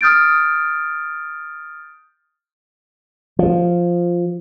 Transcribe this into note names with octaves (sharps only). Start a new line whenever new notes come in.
D#6 F6 G6 A6 D7
F3